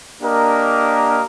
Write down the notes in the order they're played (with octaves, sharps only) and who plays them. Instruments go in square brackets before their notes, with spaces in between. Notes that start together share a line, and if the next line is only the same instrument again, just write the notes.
[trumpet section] A#3 D4 G4 A#4 D#5